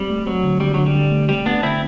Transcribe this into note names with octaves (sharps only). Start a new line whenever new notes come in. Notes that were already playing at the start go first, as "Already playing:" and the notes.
Already playing: G3 C4
A3
F#3 C4
D3
D3 G3
D3 F#3
G3
D3
A3
G3 C4
A3 B3 D4
D3 C4 E4